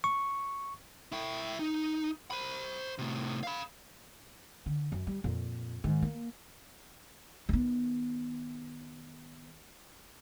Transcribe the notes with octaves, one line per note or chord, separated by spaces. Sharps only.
C#6
E4 G5
D#4
C5 B5
A2 C3
F5 B5
D3
F#2
G3
F2 A#2
G#2 D#3
A#3
D#3 B3